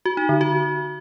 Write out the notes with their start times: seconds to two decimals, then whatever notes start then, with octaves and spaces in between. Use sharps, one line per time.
0.05 F#4
0.17 D#4
0.29 D3
0.41 F#4